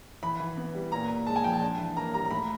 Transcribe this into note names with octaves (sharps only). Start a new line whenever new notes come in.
E3 B5
E3
B3
G3
A#2 A#5
A#2
G#3 A5
G#5
F3 G5
A5
D4
E3
A#3 A#5
G3 A#5
A#5
A2 B5